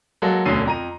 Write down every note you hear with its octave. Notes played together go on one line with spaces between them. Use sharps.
F#3 G#3 A#3 F#4 A4
E1 D2 D3 C#4 C7 D#7
F2 A#5 D#7